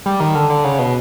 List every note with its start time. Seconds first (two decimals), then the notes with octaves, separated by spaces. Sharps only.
0.06 G3
0.20 D#3
0.35 D3
0.49 D3
0.64 C#3
0.79 B2